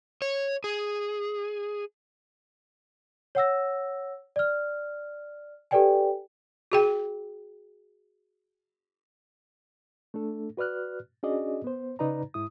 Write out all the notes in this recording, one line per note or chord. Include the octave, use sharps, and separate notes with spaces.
C#5
G#4
C#5 F#5 E6 A#6
D5 F6
G4 A4 B4 D5 G5 G#5
F#4 G#4 G5
A3 D4 A4
F#4 B4 D5 F6 F#6
C#4 D4 F#4 G#4 D5 D#5
B3 C5
C#3 D#4 B4 D5 A#5
G#2 E4 D#6